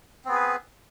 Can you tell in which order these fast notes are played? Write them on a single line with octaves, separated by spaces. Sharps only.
C4 B3 G#4 B4